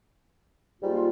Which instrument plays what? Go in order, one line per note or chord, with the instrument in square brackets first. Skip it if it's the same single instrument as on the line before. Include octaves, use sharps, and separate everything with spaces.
[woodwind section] G#2 G3 A#3 F4